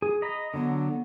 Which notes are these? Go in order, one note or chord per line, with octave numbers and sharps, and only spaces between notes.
G#4
D#5 A#5 B5
D3 F#3 B3